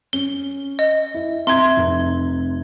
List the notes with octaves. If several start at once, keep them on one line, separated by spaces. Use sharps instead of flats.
C#4 G7
D#5
E4
C4 E5 A#5 C6 G#6
F1